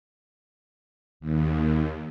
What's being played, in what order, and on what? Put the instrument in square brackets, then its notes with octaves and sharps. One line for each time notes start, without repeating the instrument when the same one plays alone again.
[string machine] D#2